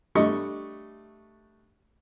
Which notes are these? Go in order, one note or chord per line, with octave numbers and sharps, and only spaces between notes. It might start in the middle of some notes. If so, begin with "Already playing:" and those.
G3 A3 D4 D#5 C#6